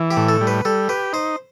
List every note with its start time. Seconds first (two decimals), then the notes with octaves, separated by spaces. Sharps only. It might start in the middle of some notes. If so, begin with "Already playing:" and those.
Already playing: E3
0.11 G4
0.17 A2
0.29 A4
0.41 G3
0.47 B4
0.65 G3 A4
0.89 G4 B4
1.13 D#4 C5